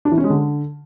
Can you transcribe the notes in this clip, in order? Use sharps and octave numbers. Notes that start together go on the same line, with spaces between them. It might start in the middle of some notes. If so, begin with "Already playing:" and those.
D4
E3
C#4
G#3
D3